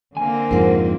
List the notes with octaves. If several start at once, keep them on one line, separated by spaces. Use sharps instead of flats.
D3 A#3 C4 G#5
F2 G#2 A#4 C5 F#5